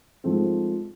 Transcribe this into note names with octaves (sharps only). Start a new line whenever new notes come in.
G#2 F3 A3 C4